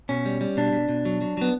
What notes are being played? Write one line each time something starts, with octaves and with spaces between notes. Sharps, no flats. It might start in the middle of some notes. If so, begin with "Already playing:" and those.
B2 C#4
G3
G3
B2 D4
B2
B2
F#3
F#3
F#3 B3